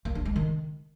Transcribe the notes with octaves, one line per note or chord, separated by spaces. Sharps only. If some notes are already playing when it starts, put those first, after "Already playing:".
A#3
D4
G#3
D#3